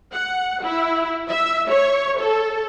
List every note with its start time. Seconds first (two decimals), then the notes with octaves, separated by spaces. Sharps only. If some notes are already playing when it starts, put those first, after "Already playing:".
0.13 F#5
0.63 E4
1.30 E5
1.69 C#5
2.20 A4